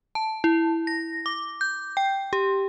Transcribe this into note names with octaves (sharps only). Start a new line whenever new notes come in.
A5
E4
A#6
D6
G6
G5
G4